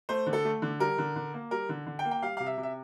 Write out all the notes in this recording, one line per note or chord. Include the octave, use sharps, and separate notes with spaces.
A3 C5
D3
A4
A3
D3
G3 A#4
D3
D3
A#3
G3 A#4
D3
D3
G5
A#3
G5
G3 F5
C3 F5
E5
C3
E5